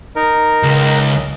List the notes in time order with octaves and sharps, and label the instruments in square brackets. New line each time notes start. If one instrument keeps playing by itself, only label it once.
[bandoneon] D#4 A#4
[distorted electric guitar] C#2